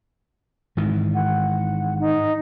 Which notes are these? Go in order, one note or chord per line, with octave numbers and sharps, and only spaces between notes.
G#2 D#3 E3
F#5
D#4